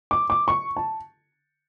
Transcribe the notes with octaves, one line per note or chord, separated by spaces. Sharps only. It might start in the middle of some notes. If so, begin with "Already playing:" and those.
D6
D6
C#6
A5